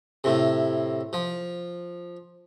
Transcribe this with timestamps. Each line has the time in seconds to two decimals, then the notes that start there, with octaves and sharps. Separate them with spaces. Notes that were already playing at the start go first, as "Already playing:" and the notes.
0.24 A2 C3
1.13 F3